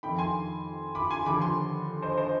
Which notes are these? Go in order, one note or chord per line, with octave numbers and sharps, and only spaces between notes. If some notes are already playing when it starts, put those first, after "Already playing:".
F2 D#3 G5 B5
G#5 C6
B5 D6
G#5 C6
D#2 D3 F3 B5 D6
G#5 C6
C5 D#5
C5 D#5